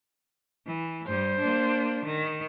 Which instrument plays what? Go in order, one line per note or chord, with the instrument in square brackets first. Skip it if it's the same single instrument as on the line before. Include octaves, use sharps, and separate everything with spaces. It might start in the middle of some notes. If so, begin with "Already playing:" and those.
[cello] E3
[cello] G2 G3 [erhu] C5
[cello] A#3 D4
D#3